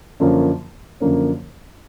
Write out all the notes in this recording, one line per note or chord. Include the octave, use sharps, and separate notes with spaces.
F#2 D3 F3 A#3 C#4
F#2 D3 F3 A#3 C#4